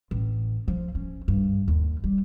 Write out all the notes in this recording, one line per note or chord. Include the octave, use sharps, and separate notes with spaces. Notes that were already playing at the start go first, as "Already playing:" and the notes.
A1
F3
C#4
G2
D#2
G3